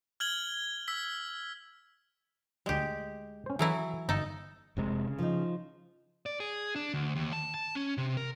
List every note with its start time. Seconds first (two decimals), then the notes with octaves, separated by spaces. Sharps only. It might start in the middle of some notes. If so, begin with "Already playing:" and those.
0.20 F6 G#6 F#7 G7
0.88 E6 B6
2.66 D2 G3 G#3 G4
3.46 C#4 C5
3.59 E3 F#3 E4 G#4 A4 D#5
4.09 G1 D#4 A4
4.77 F1 C3 G#3
5.07 C#3
5.18 F3 D#4
6.26 D5
6.40 G#4
6.76 D4
6.94 D2
7.15 D#2
7.33 A5
7.54 A5
7.75 C#4
7.98 C3
8.17 A#4